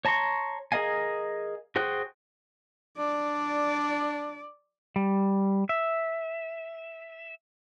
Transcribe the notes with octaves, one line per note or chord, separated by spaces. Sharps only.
C#5 A5 A#5 C6 C#6
G#4 A#4 D#5 F5 G#5
F#4 G#4 C5 G5 F#6
D4 D5
G3
E5